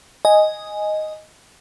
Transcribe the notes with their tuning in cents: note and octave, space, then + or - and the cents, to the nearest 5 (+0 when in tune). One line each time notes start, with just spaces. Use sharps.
D#5 +0 G#5 +0